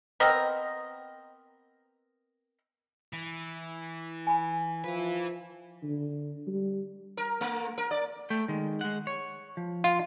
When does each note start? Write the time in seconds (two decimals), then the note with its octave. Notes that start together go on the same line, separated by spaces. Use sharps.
0.20 B3 C4 A#4 D#5
3.13 E3
4.27 G#5 B5
4.84 F3 E4 B4
5.83 D3
6.47 G3
7.17 A#4
7.41 A3
7.78 A#4
7.91 D5
8.30 A3 G5
8.48 D#3 G#3
8.81 G#3 F#5
9.07 C#5
9.57 F3
9.84 F4